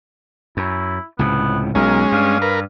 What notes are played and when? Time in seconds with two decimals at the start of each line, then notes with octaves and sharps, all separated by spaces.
0.57 F#2 E4
1.19 C#2 A2 C3 B3
1.75 B1 G#3 C#4 A#4
2.12 G2 F5
2.42 A#4 B4